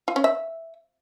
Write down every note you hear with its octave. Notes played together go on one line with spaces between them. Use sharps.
F4
C#4
E5